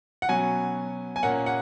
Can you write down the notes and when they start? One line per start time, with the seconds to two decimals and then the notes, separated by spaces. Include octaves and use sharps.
0.22 F#5
0.29 B2 F#3 C#4 G#5
1.16 G#5
1.23 A#2 A#3 C#4 F#5
1.46 F#5